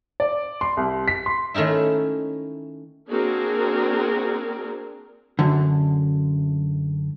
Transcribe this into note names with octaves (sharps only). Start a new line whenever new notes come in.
D5
C6
C2
B6
C6
D#3 A3 C#4 D#4 E4
A#3 C4 D4 F#4 G#4 A#4
F#2 D3